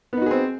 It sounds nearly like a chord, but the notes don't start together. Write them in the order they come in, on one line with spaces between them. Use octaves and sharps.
B3 D#4 F#4 G#4 C4